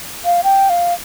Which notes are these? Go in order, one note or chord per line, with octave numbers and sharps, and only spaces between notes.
F5
G5
F5